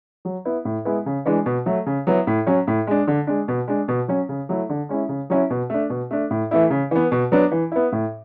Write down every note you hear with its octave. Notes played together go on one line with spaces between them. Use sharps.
F#3
B3 E4
A2
G#3 B3 E4
C#3
E3 G#3 D4
B2
F#3 A3
C#3
F#3 B3 E4
A2
F#3 C#4
A2
G#3 D4
D3
G#3 D4
B2
G#3 D4
B2
F#3 C#4
C#3
F#3 A3 E4
D3
G#3 C#4 E4
C#3
F#3 C#4 E4
B2
A3 D4
B2
A3 D4
A2
E3 A3 E4
C#3
E3 B3
B2
F#3 B3 D4
E3
B3 E4
A2